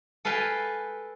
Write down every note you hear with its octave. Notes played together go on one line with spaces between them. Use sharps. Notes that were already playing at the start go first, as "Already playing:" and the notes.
A4 B4 F5 G5 G#5